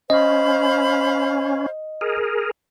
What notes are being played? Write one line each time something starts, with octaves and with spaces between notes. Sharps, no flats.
C#4 C5 D#5 F5 B5
G#4 A#4